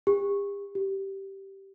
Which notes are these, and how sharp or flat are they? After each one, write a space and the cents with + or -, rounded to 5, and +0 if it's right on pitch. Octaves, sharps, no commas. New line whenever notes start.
G4 +40
G4 -10